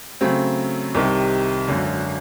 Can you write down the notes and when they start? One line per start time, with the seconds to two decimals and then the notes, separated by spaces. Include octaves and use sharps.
0.21 C#3 F#3 A3 C4
0.95 C2 C3 D#3
1.68 G#1 F#2 D3